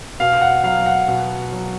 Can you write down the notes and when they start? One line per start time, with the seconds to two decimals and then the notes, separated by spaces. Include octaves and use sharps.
0.20 B2 F5
0.41 F#5
0.64 F#3 F5
0.86 F#5
1.08 B2
1.52 F#3